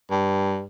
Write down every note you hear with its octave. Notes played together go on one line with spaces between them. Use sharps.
G2